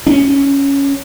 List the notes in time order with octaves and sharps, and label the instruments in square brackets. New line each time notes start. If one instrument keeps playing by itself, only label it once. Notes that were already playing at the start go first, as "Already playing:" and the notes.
[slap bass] C#4 D4